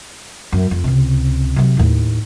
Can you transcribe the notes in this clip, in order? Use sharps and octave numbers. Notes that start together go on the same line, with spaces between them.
F#2
F2
C#2 C3
C3 F#3
D#2 A2